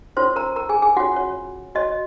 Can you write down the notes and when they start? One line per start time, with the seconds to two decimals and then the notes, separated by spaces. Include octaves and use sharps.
0.17 C#4 F4 A#4 C5 C#5 C6
0.36 A#4 A#5
0.56 A#4 A#5
0.69 G#4 G#5
0.82 G#4 G#5
0.96 C#4 F4 F#4 G#4 C#5 F#5
1.16 C#5
1.75 F#4 C#5 D#5